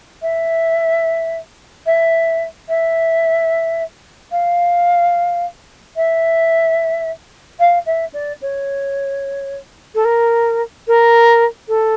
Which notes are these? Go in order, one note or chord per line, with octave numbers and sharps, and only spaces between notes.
E5
E5
E5
F5
E5
F5
E5
D5
C#5
A4
A#4
A#4
A4